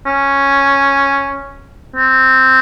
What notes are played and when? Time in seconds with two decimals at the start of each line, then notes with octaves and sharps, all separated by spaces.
0.06 C#4
1.96 C4